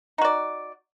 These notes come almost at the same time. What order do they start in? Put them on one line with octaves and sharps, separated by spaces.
D#4 F#4 D5